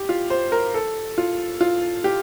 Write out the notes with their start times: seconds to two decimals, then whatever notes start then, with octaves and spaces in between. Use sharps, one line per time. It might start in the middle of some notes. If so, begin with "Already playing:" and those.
Already playing: G4
0.09 F4
0.30 C5
0.52 A#4
0.74 A4
1.18 F4
1.61 F4
2.04 G4